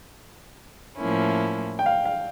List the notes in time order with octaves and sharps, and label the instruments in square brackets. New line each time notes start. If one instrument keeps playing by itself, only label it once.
[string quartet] A2 F3 A#3 C#4 E4
[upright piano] G5
F5
F5